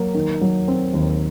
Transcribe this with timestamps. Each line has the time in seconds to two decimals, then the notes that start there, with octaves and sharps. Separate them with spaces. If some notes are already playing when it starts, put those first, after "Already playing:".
Already playing: F#3 A#3
0.14 D#3
0.41 F#3
0.68 C4
0.93 D#2